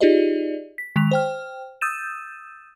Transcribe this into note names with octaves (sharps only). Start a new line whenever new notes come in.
D#4 F4 G4 G#4 D5 D#5
B6
D#3 G#3 B6 F7
C5 G5 F6
D#6 E6 G6 A6 D#7 E7